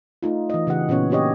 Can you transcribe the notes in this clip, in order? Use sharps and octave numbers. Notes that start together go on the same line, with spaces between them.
A3 D#4 F4
E3 D#5
C#3 E3 G4 F#5
A#2 B3 C#4 C#5
D4 F#4 G4 C#5 D#5